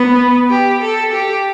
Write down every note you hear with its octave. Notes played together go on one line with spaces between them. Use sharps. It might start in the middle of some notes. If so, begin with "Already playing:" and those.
Already playing: B3
G4
A4
G4